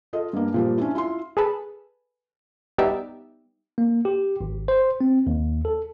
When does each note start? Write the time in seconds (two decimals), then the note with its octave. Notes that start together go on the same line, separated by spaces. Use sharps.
0.13 F4 A4 D#5
0.33 G2 A#3
0.54 A#2 F3 G3
0.78 C#4 D4 E4
0.95 E4 F4 C6
1.37 G#4 A4 B4
2.78 G3 B3 D#4 G4 D5 E5
3.78 A#3
4.05 G4
4.41 G#1
4.68 C5
5.01 C4
5.27 D#2
5.65 A4